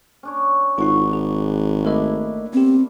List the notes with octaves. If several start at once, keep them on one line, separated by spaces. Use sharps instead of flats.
C#4 D4 C#5
G#1 D#4 F4 F#4 C#6 D6
G#4
A3 A#3 D4 E4 A#4 D#5
B3 C4 G4